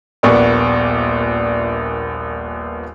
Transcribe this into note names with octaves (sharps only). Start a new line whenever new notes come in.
D#1 A#1 A#3 B3 D5 C#6